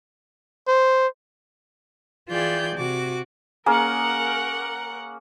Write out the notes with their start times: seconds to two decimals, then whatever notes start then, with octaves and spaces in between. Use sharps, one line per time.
0.68 C5
2.29 E3 F4 G#4 D5 G5 G6
2.76 C3 F#4 D6
3.66 A#3 C#4 G#4 A#4 F#5